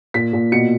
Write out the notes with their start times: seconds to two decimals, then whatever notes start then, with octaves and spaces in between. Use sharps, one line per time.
0.14 A#2 B6
0.33 A#2
0.52 B2 C#7